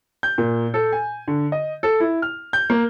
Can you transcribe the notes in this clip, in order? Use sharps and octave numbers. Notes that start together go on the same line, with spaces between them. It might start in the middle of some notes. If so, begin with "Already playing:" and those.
G6
A#2
A4
G#5
D3
D#5
A4
E4
F6
G6
A#3